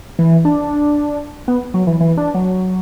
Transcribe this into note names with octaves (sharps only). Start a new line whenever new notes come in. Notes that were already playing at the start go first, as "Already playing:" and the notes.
E3
D4
B3
F#3
E3
E3
D4
F#3